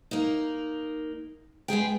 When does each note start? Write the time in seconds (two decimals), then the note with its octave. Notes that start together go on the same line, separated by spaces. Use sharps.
0.11 A#3 D#4
1.68 G#3 B3 G#4 G5